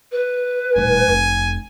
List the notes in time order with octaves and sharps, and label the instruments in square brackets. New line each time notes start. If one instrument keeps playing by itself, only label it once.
[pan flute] B4
[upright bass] D#1 A2 [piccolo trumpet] G#5
[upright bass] F1 F2